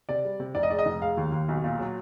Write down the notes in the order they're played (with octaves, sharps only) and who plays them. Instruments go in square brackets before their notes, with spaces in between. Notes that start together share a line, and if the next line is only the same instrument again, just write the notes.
[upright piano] C3 D5
G3
C3
F1 D5
D#5
G#3 D5
D#5
F1
G#3 F5
D#2
D#2
B1
A#2
F#3